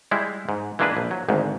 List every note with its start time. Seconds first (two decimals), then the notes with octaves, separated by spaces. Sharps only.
0.11 G3 G#3 E4
0.49 G#2
0.79 E3 G#3 A#3 D4 G#4 B4
0.97 A#1
1.11 F#3
1.29 G#1 D2 G#2